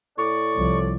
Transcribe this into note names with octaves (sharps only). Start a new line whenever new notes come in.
A2 D5 C#6
C2 F3